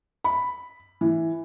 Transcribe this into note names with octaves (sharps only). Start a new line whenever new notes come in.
B5
E3